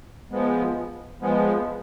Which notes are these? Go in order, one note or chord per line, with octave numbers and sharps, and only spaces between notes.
F3 G#3 B3
F3 G#3 B3